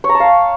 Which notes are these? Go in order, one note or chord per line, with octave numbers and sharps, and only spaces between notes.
C#5
A#5
A5
F5